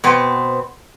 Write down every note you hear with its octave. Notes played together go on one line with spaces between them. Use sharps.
B2 B3 C4 C5